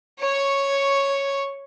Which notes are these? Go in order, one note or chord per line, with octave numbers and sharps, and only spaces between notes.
C#5 C#6